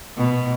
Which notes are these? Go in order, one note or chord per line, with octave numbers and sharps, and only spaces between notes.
B2